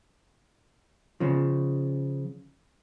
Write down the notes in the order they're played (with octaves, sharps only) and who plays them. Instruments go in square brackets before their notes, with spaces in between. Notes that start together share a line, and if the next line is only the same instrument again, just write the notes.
[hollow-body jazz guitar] C#3 F3